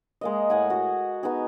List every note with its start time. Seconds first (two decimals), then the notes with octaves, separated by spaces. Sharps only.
0.21 G#3 A#3 D#5
0.50 A2 F#5 G#5
0.70 F#4 G#4
1.23 B3 D#4 G#4